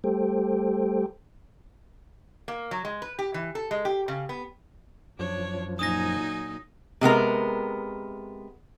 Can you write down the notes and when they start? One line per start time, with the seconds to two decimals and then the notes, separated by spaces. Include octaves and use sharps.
0.04 G3 A3 G4 A4 C5 G5
2.48 A#3
2.71 F#3
2.85 G#3
3.02 B4
3.19 G4
3.34 E3
3.55 A4
3.71 G#3
3.85 G4
4.08 C#3
4.29 B3
5.19 F#2 F3 D4 C#5
5.79 A#2 F#3 D#4 G#5 D#6 A#6
7.01 C3 G#3 B3 A#4